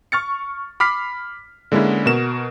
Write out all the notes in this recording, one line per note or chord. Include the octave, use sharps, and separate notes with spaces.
C#6 F6 A6 C#7
B5 D6 F6 B6 C7
D3 G#3 A#3 C#4 E4
B2 F#4 A#4 E7